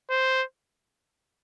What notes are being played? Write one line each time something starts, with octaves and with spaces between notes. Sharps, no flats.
C5